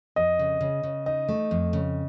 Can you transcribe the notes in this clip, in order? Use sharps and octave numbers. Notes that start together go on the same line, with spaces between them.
F2 D#5
C#3
C#3
C#3
D#4 D#5
A3
F2
C#3